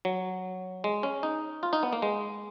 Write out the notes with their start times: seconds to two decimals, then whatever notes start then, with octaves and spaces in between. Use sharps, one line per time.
0.05 F#3
0.84 G#3
1.03 C#4
1.23 D#4
1.63 F4
1.73 D#4
1.83 B3
1.93 A#3
2.02 G#3